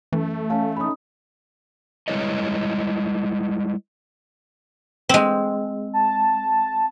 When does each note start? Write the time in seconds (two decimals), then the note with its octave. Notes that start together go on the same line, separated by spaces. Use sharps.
0.12 F#2 E3 A3
0.50 C#4 F5 A5
0.77 C#4 D#4 B5 D#6
2.08 G3 G#3 E4 B4 C#5 D#5
5.09 G#3 C4
5.93 A5